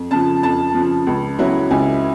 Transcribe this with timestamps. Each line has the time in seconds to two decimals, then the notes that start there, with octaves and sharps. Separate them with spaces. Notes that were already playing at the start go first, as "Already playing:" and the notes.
Already playing: F2
0.11 C#3 F3 A5
0.43 F2 A5
0.75 C#3 F3
1.07 C#2
1.39 C#3 F#3 B3 E4
1.70 C#2 G#5